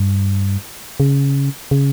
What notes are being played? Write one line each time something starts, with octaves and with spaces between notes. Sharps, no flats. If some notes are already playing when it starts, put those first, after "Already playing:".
Already playing: G2
C#3
C#3